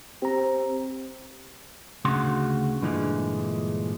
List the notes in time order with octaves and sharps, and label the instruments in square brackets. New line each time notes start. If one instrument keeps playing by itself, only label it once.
[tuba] C4 [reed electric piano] G4 A#5
[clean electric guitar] D2 C#3 F#4 C6
G2 A#2 D3 E3 G#3